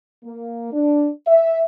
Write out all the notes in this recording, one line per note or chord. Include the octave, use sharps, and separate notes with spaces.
A#3
D4
E5